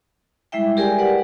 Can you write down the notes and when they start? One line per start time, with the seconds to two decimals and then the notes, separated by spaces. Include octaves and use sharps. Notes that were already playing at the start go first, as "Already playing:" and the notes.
0.52 G3 G#3 E4 E5 G5
0.77 G4 G#4 A#4 D5 G5 G#5
0.98 B4 D5 F#5